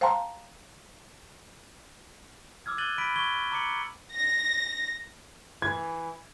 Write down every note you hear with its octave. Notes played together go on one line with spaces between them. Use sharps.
C5 F5 G5 A5 A#5 C6
D6 E6 F6 G#6
F#6 G#6 A6 D#7 F#7 G7
B5 B6 D7
C#6 G#6 G7
G#6
A#5 D6 C#7 F#7
A#6
E3 G#6